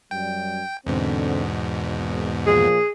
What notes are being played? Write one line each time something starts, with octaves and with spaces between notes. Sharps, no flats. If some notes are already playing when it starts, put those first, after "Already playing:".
F#2 G3 G5
E2 G#2 B2 D3 C4
G#1
A#2 F3 G#4